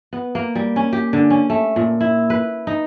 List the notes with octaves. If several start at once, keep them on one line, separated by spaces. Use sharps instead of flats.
B3
A#3
G3
C#4
G4
D3
C#4
A3
A#2
E4
B4
D#4